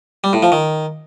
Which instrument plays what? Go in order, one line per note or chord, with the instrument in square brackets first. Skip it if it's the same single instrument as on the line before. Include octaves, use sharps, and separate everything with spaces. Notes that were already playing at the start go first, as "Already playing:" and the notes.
[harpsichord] G3
A2
F3
D#3